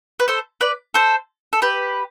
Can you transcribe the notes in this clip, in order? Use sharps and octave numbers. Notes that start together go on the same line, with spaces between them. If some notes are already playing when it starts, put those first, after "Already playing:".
B4
A4 C5
B4 D5
A4 C5
A4
G4 B4